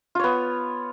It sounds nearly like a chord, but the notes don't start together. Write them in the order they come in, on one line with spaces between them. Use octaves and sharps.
F4 C#5 B3